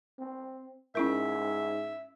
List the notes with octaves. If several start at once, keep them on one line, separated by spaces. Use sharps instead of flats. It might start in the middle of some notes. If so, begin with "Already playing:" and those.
C4
G#2 C#4 E4 A#4 E5